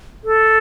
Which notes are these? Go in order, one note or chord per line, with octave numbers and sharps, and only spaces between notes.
A4